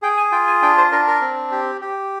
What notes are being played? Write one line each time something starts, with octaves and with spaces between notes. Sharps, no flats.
G#4 G5
G#5
F4 G5
G#5
D4 G5
C5
D4 A#4
A#4
C4
G4
G4